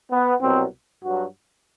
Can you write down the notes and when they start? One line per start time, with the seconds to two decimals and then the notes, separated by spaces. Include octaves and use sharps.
0.12 B3
0.41 C2 B2 F#3 C4
1.03 G2 F#3 F#4